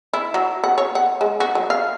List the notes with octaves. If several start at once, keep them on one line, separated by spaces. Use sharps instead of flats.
E4
F#3
F#5
C#5
F#5
G#3
F#4
F#3
F5